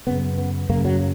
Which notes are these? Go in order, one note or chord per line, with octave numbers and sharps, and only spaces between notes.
F#2 C#3 B3
B3
F#2 C#3 A#3
F#3